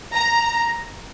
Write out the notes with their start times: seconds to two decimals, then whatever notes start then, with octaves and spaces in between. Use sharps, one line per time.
0.12 A#5